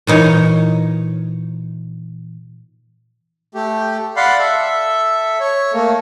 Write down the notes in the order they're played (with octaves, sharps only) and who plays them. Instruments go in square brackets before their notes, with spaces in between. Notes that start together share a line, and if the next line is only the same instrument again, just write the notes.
[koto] A#2 E3 D#4 C#5
[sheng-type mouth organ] A3 G4
D5 F5 F#5 B5 C6
A4 E5
C#5
A3 A#3